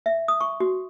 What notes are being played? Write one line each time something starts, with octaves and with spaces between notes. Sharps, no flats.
E5
D#6
C#6
F#4